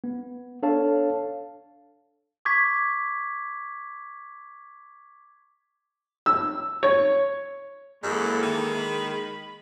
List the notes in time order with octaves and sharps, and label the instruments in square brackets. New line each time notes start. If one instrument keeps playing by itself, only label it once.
[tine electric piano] B3
D4 A4 C#5 F5 A5
[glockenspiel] C#6 D6 G#6 B6
[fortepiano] E6
C#5
[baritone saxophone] F#2 [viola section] E3 A#3 A4 [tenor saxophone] G#3
[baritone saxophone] D#3
[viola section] B5